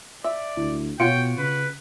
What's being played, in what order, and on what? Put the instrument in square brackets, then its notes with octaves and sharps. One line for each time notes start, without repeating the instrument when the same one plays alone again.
[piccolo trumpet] D5 [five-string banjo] E5
[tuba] D2 [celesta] E4
[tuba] B2 [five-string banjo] F4 F#4 C#5 [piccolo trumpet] G5 [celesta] C#7 D7
[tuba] C#3 [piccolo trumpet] B4